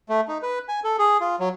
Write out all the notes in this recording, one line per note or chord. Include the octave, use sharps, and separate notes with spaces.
A3
D#4
B4
G#5
A4
G#4
F4
F#3